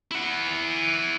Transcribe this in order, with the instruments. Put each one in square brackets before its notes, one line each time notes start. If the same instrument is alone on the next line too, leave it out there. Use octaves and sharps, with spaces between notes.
[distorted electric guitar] E4 F#5